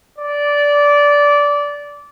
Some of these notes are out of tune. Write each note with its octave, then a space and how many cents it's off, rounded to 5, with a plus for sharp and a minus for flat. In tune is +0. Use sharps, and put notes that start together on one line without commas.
D5 -15